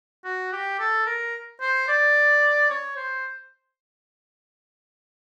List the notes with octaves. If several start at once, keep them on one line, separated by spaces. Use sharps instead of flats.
F#4
G4
A4
A#4
C5
D5
C#5
C5